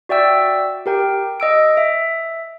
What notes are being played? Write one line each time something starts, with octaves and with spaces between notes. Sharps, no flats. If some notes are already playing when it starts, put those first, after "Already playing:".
F#4 D5 E5 G5 E6
G4 A#4 G5
D#5 E6 D7
E5